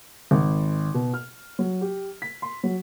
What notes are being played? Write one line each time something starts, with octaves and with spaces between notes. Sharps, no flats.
G#1
B2
F6
F#3
G4
B6
C6
F#3